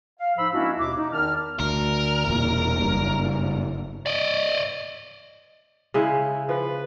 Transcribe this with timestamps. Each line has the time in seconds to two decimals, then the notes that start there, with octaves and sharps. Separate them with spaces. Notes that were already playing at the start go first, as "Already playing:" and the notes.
0.20 F5
0.37 G#2 F3 D#4 B5 E6
0.53 G#3 A#3 C#4 D4 E4 F#4
0.79 D#2 B2 D6
0.97 D#4
1.11 E2 D#3 A5 F6
1.60 D2 A#4
2.27 E1 E2 A#2
2.80 F#1 G2
4.06 D5 D#5
5.94 C#3 G#3 E4
6.49 F3 B4